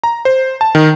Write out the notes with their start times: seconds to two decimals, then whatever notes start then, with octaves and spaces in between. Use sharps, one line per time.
0.04 A#5
0.25 C5
0.61 A5
0.75 D#3